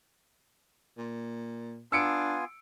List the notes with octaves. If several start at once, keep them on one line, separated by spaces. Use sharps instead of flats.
A#2
B3 D4 F4 G#5 E6 C#7 D7